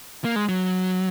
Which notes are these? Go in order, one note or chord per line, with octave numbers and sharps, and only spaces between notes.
A#3
G#3
F#3